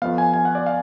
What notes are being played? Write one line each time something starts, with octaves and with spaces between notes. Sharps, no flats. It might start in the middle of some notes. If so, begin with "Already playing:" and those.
F2 F3 B3 F5
G#5
G#5
F#5
D5
F5